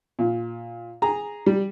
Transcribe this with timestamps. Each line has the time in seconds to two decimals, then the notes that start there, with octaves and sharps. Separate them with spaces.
0.19 A#2
1.02 G#4 A#5
1.46 G3